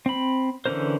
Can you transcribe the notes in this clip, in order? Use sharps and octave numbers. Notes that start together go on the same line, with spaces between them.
C4 B5
D3 E3 C#4 A#4 C5